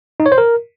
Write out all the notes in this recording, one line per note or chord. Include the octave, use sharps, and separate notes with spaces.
D#4
C#5
C5
A#4